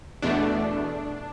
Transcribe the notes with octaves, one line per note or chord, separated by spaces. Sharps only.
E2 B2 A3 D4